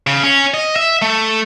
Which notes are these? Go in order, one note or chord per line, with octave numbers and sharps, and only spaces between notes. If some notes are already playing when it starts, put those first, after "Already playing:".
C#3
C#4
D#5
E5
A3